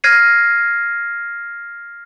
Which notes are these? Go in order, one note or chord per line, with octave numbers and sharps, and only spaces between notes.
F6 G#6 A#6 C7 D#7